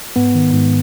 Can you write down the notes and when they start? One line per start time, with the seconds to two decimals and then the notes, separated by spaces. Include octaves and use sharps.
0.16 G#2 B3
0.35 D#3
0.54 G#2